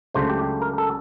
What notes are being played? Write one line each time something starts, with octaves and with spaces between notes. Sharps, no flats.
C#2 C#3 F#3 A3 D4 C5
G4
A#4
A4